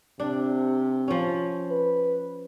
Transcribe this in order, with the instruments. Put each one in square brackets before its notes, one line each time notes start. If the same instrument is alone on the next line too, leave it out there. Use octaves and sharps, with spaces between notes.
[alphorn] C3 [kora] D4
[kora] F3 C#4
[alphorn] B4